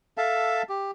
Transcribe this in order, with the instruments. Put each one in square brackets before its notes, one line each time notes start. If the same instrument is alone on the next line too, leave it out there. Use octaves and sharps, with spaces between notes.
[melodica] A4 E5 F5 A5
G4